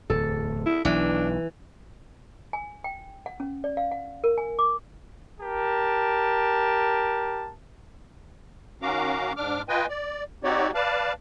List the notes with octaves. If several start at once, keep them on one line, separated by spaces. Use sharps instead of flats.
D1 E2 A4
E4
B1 E3 D4
G#5
G5
F#5
C#4
D5
F5
F#5
A#4
G#5
D6
G4 A#4 A5
D#3 C#4 F#4 F5 A#5 D6
G#2 D4 D6 F6
F4 B4 D#5 G5 G#5
D5
C4 D#4 F#4 G4 C#5 D5
B4 D5 F5 A5